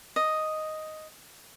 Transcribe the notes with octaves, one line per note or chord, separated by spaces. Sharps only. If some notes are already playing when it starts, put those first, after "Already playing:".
D#5